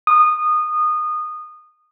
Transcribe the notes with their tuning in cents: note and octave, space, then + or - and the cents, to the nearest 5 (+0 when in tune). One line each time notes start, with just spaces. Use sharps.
D#6 -20